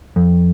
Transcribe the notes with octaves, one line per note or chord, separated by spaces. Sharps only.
F2